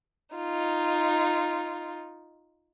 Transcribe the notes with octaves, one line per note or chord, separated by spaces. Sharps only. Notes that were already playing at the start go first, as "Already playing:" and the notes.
D#4 F4